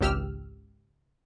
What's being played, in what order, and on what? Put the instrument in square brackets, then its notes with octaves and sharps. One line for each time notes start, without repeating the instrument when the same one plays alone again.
[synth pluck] G#1 C#2 G4 E6 F6